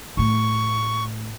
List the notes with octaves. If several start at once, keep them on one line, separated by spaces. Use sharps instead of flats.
A2 A3 C#6